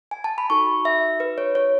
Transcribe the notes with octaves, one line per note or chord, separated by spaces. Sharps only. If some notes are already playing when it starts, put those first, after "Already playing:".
G#5
A5
B5
D#4 F#4 A4 C#6
E5
B4
C#5
C#5